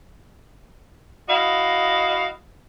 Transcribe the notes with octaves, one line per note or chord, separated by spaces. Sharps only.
E4 F#4 D#5 F5